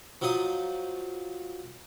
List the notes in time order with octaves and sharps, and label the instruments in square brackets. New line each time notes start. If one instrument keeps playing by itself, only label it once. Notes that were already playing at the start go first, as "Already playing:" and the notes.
[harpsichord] F3 F#3 D#4 D#6